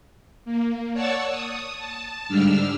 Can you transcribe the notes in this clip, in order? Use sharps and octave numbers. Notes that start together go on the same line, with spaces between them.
A#3
C#5 D5 F#5 A5 C#6 E6
D#6
A5
G#2 D3 G3 D4 E6 F6